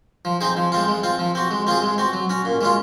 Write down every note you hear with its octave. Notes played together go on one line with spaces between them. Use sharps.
F3
C4 D#4 G#4
F3
G#3 C4 F4
G#3
C4 F4
F3
C4 F#4
G#3
C4 F4 G#4
G#3
C4 F#4
F#3
C#4 F#4
A#2
G#3 C#4 F4